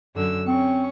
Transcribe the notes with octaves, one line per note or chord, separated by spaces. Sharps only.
F#2 D3 E6
C4 C#4 C#6